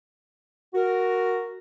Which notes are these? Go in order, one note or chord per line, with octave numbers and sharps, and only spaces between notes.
F#4 A#4